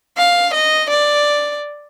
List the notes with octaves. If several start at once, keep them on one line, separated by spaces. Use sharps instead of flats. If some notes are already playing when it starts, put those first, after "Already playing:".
F5
D#5
D5